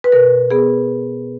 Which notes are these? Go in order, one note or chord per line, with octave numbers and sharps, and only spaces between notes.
B4
B2 A#4
B3 G#4